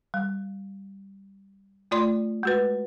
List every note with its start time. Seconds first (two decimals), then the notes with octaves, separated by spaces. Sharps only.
0.14 G3
1.91 A3 F4 D5 C6
2.43 G#3 F#4 B4